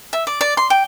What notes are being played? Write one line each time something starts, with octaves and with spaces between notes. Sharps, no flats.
E5
D5
D5
C6
G5